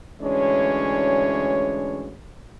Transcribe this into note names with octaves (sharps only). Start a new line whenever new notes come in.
D2 E3 G#3 C#4 D4 C#5